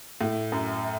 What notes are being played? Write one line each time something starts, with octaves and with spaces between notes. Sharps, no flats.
A2
F#2